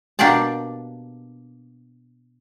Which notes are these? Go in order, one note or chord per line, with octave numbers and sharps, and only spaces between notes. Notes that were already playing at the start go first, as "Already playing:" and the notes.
B2 A#3 D4 G4 D5 A5